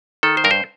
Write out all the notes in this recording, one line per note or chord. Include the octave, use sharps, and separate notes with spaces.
D#3 A4
C5
G2 A#4
C5